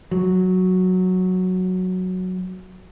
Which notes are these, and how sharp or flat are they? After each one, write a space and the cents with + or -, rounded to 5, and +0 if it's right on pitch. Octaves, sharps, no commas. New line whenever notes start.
F#3 -5